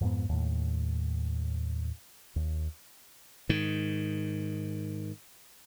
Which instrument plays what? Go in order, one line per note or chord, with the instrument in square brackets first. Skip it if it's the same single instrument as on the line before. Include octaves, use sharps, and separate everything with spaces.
[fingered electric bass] F2 G#2 B3
D#2 A2
D#2
[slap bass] G#2 D#3